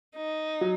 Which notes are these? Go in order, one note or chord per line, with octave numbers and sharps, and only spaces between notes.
D#4
F#3